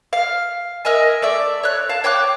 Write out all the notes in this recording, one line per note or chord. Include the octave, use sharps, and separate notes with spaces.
F5
A#4 D#5 E5 G#5
A3 D5 E5
C#5 F#6
F5 A5
C#5 G5 D6 F#6